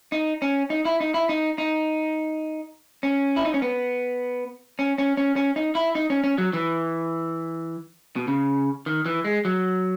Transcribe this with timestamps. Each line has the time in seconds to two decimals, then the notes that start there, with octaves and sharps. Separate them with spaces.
0.12 D#4
0.42 C#4
0.70 D#4
0.85 E4
1.00 D#4
1.14 E4
1.29 D#4
1.58 D#4
3.03 C#4
3.36 E4
3.45 D#4
3.54 C#4
3.62 B3
4.79 C#4
4.98 C#4
5.17 C#4
5.36 C#4
5.56 D#4
5.75 E4
5.95 D#4
6.10 C#4
6.24 C#4
6.38 F#3
6.53 E3
8.16 B2
8.28 C#3
8.86 D#3
9.06 E3
9.25 G#3
9.45 F#3